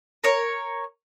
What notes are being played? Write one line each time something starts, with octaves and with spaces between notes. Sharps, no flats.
A#4 C#5